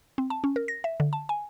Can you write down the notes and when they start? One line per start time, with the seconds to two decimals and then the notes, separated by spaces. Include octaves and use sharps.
0.18 C4
0.30 A5
0.44 C#4
0.56 A#4
0.68 A#6
0.84 E5
1.00 D3
1.13 A5
1.29 G#5